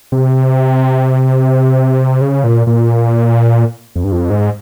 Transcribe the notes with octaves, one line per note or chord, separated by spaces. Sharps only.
C3
C#3
A#2
A#2
F2
G2
F2
G#2